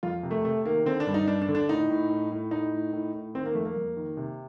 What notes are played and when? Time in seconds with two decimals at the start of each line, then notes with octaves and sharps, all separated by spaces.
0.03 F2 F4
0.23 C3
0.31 A3
0.44 C3 A3
0.65 D#3 A#3
0.86 D3 C4
1.00 D4
1.07 G2
1.14 D#4
1.27 G2 D4
1.42 D4
1.49 D3
1.55 D4
1.69 A2 D#4
1.90 A2
2.10 A2
2.31 A2
2.51 A2 D#4
2.73 A2
2.93 A2
3.14 A2
3.34 D#3 C4
3.46 A#3
3.55 F2 A3
3.65 A#3
3.77 F2
3.97 D#3
4.17 C3